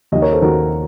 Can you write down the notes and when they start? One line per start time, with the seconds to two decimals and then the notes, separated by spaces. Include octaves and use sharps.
0.12 D#2 D#3 D#5
0.22 A#4 C#5
0.32 A4 C5
0.42 D#2 D#3 F#4 A#4